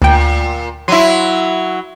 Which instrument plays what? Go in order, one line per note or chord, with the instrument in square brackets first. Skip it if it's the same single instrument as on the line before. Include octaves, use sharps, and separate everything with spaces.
[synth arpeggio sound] D2 G5 [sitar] A#2
[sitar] F#3 E4 [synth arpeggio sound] C6 D#7